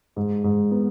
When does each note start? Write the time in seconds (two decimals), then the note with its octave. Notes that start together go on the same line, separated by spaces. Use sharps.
0.16 G#2
0.44 G#2
0.71 B3